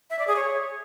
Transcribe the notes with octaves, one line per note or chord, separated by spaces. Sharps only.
E5
D5
G#4
C#5